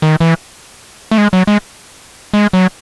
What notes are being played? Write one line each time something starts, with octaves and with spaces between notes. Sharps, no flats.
D#3
E3
A3
G#3
F#3
G#3
G#3
F#3